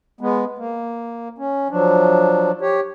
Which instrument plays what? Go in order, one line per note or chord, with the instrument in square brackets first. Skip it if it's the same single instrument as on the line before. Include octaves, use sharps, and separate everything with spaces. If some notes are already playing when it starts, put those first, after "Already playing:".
[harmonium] G#3 B3
A#3
C#4
F3 F#3 D4
G4 C#5